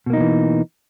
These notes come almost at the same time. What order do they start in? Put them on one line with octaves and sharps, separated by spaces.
B2 A#3 D#4 F3 E3